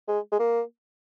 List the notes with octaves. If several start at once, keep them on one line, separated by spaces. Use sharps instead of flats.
G#3
G#3
A#3